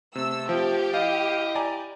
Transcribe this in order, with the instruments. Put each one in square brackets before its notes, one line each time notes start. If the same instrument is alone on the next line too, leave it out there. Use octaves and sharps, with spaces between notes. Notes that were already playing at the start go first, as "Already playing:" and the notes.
[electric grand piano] C3 [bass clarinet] A3 [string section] E6
[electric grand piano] F3 [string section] G4
[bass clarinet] E4 [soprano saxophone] D#5 [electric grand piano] F5
[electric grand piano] D5 G#5 A#5